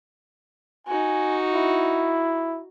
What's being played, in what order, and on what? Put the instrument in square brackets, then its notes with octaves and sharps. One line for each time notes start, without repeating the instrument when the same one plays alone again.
[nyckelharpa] D#4 F#4 [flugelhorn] G#5
[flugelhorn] E4